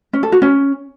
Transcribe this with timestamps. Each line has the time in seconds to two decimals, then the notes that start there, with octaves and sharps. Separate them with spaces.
0.13 C#4
0.23 A4
0.32 F#4
0.42 C#4